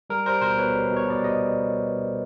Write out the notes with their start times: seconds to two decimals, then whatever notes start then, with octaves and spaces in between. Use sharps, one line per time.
0.10 G3 A#4
0.26 G3 A#4 C5
0.41 B2 A#4 C5
0.57 B2 B4 C#5
0.74 G3
0.91 B2
0.97 C#5
1.06 B2 D5
1.22 G3 D#5